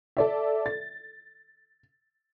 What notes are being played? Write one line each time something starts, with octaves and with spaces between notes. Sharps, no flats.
A4 D5 E5
A6